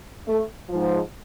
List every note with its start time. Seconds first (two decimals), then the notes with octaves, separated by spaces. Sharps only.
0.27 A3
0.69 G#2 F3